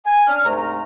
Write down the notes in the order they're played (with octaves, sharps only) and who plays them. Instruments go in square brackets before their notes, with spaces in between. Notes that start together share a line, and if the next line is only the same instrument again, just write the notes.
[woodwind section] G#5
C#4 D4 F6
C2 G#2 A3 A#5